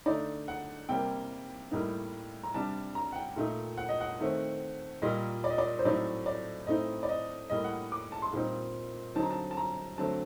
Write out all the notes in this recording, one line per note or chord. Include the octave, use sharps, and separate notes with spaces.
D3 A3 D#4 D5
F#5
C3 G3 A#3 G5
A2 G3 A#3 D#4
A#5
C3 G3 D4 A5
A#5
F#5
G5
A#2 A3 D#4
F#5
D#5
F#5
D#3 A3 C4
A#2 G3 A#3 D#5
D5
D#5
D5
C5
A2 F#3 A3 C4 D#4 D5
D5
A2 A3 C4 D#4 D#5
D5
D#5
A2 G3 A#3 D#5
F#5
D6
A5
C6
A#2 G3 C4 D#4
D3 F#3 C4 D#4 A5
A#5
A5
A5
A#5
D3 F#3 A3 C4 A5